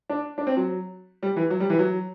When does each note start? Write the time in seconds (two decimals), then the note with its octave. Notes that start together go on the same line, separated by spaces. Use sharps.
0.09 D4
0.38 D4
0.47 C4
0.57 F#3
1.23 G3
1.36 E3
1.50 F#3
1.60 G3
1.70 E3
1.79 F#3